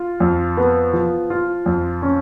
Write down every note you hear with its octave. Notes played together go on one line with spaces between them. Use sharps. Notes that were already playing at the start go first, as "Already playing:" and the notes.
Already playing: F4
F2
B3
F3
F4
F2
C#4